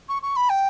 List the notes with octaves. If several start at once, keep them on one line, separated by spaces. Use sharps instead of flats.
C#6
C#6
B5
G5